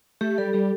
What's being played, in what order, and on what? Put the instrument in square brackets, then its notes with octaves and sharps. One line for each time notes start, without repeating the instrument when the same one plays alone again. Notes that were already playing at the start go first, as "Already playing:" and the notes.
[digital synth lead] A3 [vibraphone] G4
[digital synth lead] G3 [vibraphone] A4
[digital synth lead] G3 [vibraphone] G4